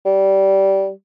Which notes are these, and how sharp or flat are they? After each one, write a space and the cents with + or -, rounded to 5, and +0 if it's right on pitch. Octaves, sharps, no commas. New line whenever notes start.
G3 -15